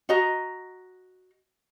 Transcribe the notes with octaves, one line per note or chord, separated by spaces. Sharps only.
F#4 D#5 A#5